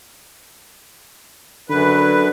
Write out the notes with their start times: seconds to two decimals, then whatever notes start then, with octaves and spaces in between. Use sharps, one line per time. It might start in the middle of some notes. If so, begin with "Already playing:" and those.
1.69 F#2 D3 B4